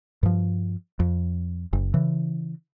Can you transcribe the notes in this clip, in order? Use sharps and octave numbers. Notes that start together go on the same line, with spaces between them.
G2 F3
F2
F#1
C#3 E3